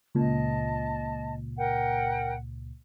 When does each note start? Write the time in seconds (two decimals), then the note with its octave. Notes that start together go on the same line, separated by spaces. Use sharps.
0.15 C#2 A#2 D#5 A5
1.56 A#4 F#5 G5